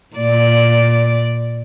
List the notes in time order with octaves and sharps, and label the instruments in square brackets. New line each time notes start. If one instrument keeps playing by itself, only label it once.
[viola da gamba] A#2 D5